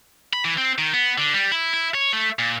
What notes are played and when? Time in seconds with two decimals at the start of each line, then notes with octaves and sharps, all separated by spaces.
0.33 B5
0.45 E3
0.58 C4
0.78 D#3
0.94 B3
1.18 D3
1.34 G3
1.52 E4
1.74 E4
1.94 C#5
2.13 A3
2.39 A#2